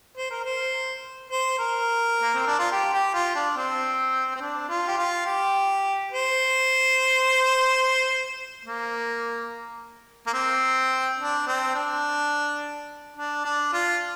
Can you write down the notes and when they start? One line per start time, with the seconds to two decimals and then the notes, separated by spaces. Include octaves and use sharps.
0.17 C5
0.31 A#4
0.44 C5
1.30 C5
1.59 A#4
2.22 A#3
2.34 C4
2.47 D4
2.59 F4
2.72 G4
2.93 G4
3.14 F4
3.35 D4
3.57 C4
4.36 C4
4.41 D4
4.69 F4
4.88 G4
4.97 F4
5.26 G4
6.11 C5
8.65 A#3
10.26 A#3
10.34 C4
11.19 D4
11.47 C4
11.75 D4
13.16 D4
13.45 D4
13.73 F4